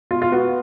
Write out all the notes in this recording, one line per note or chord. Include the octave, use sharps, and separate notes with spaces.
B2 F4
F4
B3 F#4